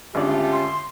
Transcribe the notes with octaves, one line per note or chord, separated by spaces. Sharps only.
G#1 D3 A3 C#4 F4 G4 D5
C6